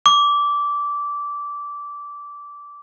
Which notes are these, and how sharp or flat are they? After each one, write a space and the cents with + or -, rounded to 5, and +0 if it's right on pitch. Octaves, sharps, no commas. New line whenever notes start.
D6 -15